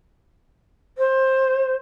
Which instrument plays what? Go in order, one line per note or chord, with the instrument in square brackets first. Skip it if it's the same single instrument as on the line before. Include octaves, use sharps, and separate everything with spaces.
[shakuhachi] C5